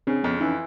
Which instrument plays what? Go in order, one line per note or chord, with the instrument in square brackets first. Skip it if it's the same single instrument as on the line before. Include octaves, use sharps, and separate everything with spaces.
[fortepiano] C#3 [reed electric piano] C4 D4
[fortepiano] F2 [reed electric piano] B3 C#4
[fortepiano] E3 [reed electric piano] C#4 D#4